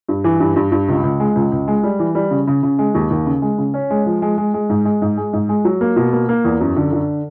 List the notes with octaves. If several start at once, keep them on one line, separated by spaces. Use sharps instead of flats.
G2
E3
G2
G2
G2
C#2
C#2
G#3
C#2
C#2
G#3
G3
E3
G3
C#3
C#3
C#3
G#3
D#2
D#2
C#3
G#3
C#3
C#4
G#3
F3
G#3
G#3
G#3
G#2
G#3
G#2
G#3
G#2
G#3
F#3
A#3
B2
A#3
A#3
E2
F#2
D3
D3